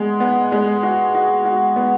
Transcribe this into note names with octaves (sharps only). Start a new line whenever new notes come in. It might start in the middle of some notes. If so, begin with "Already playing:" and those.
Already playing: G#3 B3
B3
G#3
F#4
F#4
F#4
B3